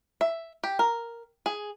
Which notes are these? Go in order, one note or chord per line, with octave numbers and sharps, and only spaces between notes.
E5
G4
A#4
G#4